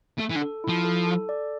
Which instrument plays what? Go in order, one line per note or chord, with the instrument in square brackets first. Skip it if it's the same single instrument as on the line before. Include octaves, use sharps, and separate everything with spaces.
[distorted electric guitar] A3 [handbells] A4
[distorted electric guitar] E3
D3
[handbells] A4
[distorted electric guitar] F3 [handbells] E4
[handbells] A4
A4
D5